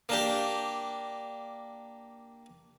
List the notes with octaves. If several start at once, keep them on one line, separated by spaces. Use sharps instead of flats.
A#3 D4 G4